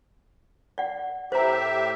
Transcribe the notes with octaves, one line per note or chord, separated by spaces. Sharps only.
D5 F#5
A2 G4 C5 E5 A#5